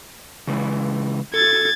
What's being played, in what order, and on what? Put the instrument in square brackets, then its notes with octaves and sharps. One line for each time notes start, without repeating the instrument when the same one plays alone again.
[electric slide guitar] C#3 E3 G#3
[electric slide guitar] A4 [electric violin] G#6 A6